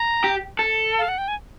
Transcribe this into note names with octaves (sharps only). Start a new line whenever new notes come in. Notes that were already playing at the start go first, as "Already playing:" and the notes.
Already playing: A#5
G4
A4
F5
F#5
G5
G#5